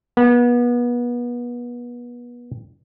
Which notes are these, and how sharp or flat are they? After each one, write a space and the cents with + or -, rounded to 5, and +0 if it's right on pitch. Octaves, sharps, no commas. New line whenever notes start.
B3 -30